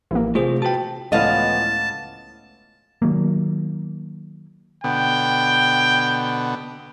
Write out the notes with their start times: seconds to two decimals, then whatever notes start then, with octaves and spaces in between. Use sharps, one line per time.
0.11 A1 E3 F3 A#3
0.35 C3 A3 F4 G#4 C5
0.62 F#4 B4 G5 A5
1.12 C#2 A2 E3 F3 B3 D#5 F5 A5
3.02 D#3 F#3 A#3
4.84 B2 D3 B3 G5